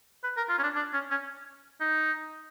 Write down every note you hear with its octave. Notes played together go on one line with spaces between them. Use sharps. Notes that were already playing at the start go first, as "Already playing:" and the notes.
B4
A#4
F4
C#4
D4
D4
C#4
C#4
D#4